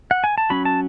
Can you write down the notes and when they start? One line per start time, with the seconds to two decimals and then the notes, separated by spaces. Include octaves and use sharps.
0.11 F#5
0.24 G#5
0.38 A5
0.50 F#3 C#4 B5
0.65 A5